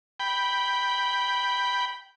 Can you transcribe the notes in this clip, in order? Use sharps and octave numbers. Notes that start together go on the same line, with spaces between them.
G5 B5